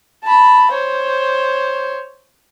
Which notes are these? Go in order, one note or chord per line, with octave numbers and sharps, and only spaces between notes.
A5 B5
C5 C#5